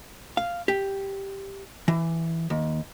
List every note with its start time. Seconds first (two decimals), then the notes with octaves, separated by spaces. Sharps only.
0.37 F5
0.68 G4
1.88 E3
2.50 D#2